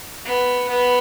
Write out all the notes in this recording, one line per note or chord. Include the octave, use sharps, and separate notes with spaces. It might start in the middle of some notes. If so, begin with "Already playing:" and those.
B3
B3